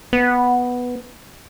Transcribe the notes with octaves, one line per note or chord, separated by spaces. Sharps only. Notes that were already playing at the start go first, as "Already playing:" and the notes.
B3